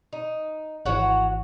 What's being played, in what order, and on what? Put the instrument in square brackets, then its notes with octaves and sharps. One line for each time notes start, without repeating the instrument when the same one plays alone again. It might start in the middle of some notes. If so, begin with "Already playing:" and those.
[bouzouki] D#4
[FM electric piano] G#1 E3 [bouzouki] F#4 C#5 F#5